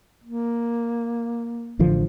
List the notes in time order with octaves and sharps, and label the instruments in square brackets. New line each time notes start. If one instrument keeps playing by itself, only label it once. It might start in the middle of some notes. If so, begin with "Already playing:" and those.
[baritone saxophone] A#3
[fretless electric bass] A1 D3 F3